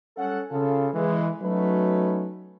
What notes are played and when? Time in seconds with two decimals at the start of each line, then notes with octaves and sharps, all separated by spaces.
0.17 G3 C#4 A4 F#5
0.51 C#3 F4 A4
0.93 E3 G#3
1.41 F#3 A3 C#4 D#4 F#4 B4